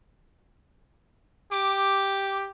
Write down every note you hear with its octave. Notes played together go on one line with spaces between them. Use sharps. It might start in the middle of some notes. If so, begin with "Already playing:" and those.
G4 D6